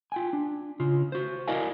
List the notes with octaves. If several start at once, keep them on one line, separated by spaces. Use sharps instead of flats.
F4 G5 G#5
D4
C#3 F4
F#4 C5
E4 A#4 D5 D#5 F5 G#5